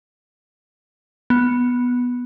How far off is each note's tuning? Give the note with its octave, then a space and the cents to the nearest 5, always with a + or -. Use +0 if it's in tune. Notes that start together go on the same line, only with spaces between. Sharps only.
B3 -5